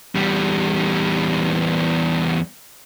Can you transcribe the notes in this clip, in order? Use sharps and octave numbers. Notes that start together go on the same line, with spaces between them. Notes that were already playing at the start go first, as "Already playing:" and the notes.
E2 G3